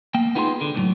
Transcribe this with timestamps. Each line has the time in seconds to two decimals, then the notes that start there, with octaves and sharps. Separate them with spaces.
0.14 A#3 G5
0.35 B3 D#4 F4 G#4 G#5 C6
0.61 D3
0.75 C#2 A2 F#3